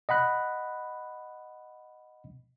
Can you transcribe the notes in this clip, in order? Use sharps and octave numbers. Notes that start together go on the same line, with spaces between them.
D#5 F#5 B5 F#6